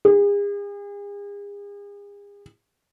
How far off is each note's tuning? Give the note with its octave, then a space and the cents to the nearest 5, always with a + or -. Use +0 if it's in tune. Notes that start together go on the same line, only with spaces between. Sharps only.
G#4 -40